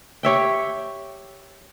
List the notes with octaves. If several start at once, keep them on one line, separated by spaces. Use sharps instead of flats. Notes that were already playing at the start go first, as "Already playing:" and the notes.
G4 C#5 E5 G5